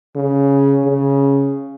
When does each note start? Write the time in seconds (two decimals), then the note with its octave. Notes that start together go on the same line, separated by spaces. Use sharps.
0.16 C#3
0.85 C#3